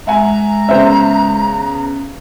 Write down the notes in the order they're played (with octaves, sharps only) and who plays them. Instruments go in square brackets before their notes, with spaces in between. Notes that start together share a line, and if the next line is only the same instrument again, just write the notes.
[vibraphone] G#3 [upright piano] E5 F#5 G#5 [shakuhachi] A#5
[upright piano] C#3 B3 [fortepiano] C5 E5